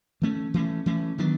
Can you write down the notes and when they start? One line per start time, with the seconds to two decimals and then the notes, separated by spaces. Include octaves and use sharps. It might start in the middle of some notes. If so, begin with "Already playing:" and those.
0.22 E3 A3 C#4
0.54 E3 A3 C#4
0.86 E3 A3 C#4
1.18 D#3 F#3 B3 D4